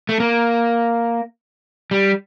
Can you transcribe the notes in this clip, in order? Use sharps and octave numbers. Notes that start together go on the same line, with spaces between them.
A3
A#3
G3